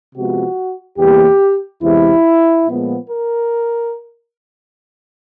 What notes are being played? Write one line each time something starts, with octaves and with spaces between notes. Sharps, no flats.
C3 F3 G#3 B3 F#4
E2 C3 E3 G3 A#3 G4
E2 C3 E3 G#3 E4
A#2 F3 G#3 B3
A#4